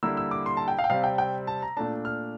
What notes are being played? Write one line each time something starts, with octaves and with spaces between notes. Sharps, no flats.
D3 G3 A#3 E4 E6
E6
D6
C6
A5
G5
F5
G5
C3 G3 C4 F5
G5
G5
A5
A#5
A#2 A3 D4 A5
F6